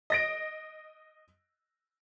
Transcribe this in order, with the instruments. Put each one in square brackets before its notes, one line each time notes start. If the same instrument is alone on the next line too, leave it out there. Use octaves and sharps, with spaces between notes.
[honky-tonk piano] D#5 A#6 D7